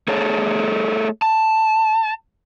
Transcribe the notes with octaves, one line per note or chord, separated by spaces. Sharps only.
A3 G#4 A4 C#5
A5